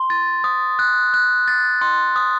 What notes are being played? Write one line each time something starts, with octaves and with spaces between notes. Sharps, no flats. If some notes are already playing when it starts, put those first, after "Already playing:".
Already playing: C6
A6
D#6
F#6
F#6
A6
C6
D#6